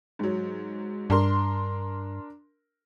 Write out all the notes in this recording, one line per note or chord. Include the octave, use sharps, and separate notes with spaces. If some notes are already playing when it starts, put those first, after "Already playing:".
G#2 F#3
G2 D4 A#4 C6